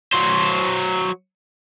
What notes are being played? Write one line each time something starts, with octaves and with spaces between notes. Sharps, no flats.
F#3 C5